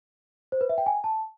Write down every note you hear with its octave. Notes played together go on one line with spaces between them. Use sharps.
C5
B4
E5
G5
G#5
A5